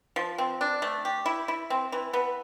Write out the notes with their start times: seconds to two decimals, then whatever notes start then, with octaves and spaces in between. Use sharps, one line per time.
0.16 F3
0.38 C4
0.61 D4
0.82 A3
1.05 G4
1.26 E4
1.48 E4
1.70 C4
1.92 E3
2.13 B3